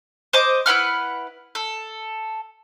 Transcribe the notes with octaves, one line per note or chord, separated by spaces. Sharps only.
C5 D#5 D6
E4 B4 F#5 F6
A4